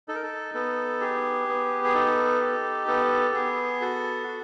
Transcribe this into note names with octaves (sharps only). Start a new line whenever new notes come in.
D#4 A4
A#4
A4
B3 A4
G4 G#4
B3
G#4
D#4 A4
G4
B3 A4
B3 G#4
F#4 A4
F#4